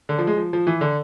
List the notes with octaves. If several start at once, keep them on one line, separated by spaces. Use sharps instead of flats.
D3
F3
G#3
F3
F3
E3
D3